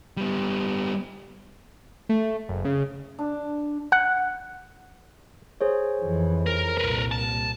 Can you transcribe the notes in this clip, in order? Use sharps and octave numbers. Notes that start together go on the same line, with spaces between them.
G3 B3
A3
F#1
C#3
D4
F#5
G#4 C5 C#5
F2 E3
A#4
C2 A#2 A#4 B4
A5